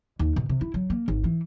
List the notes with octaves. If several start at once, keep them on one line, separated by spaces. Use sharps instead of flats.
D#2
B2
C3
E4
F#3
A#3
G#1
E3